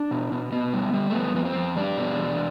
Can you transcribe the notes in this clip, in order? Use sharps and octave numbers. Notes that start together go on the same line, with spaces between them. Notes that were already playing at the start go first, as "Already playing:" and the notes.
Already playing: D4
B2
B2
B2 B3
G3
G3
A3
F2 B3
F2 B3
C4
F2
G3 D4
B2
E2